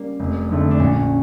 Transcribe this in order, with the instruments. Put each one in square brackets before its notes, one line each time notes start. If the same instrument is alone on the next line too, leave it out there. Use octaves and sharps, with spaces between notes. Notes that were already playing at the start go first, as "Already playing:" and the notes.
Already playing: [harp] G3 A#3 C#4
[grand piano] F1
F2 D3 A3
[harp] D4
[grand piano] A#1 [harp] C#4